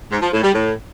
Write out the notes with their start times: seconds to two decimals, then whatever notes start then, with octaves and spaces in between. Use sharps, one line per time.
0.11 G#2
0.22 F3
0.32 A2
0.43 G3
0.54 A2